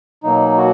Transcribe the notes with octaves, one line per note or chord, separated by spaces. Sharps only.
B2 F#3 A#3 D#4
F#4